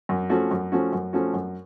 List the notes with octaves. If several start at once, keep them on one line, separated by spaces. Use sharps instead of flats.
F#2
F3 A3 C#4 F#4
F#2
F3 A3 C#4 F#4
F#2
F3 A3 C#4 F#4
F#2